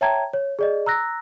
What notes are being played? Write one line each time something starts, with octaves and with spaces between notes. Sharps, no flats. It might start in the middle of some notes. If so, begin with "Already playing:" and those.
C#5 E5 G5 A5 A#5 G#6
C#5
G#4 D5 D#5
A#5 E6 F#6 A#6